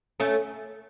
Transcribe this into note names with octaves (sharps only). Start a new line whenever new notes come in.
A3 C#4